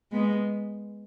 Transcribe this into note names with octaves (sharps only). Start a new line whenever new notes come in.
G#3 B3